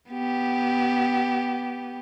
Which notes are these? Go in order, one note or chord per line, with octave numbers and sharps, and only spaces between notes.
B3 G4